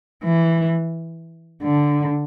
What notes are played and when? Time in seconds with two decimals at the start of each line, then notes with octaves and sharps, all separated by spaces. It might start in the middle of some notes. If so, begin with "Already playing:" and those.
0.25 E3
1.63 D3